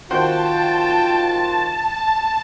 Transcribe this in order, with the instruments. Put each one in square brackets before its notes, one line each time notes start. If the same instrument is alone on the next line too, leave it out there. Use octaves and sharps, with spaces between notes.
[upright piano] D#3 F#4 C5 [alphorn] F4 [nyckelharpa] G5 [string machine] A5